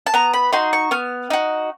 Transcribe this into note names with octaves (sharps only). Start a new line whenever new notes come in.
A5
B3 A#5
B5
D#4 F#4 C6
C#6
B3 F6
D#4 F#4